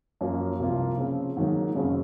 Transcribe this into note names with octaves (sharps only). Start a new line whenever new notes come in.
F#2 F3 A#3
C2 C3 F3 A#3 F4
C#3 F3 C4
G#2 D#3 F#3 A#3
F#2 C#3 G#3 C4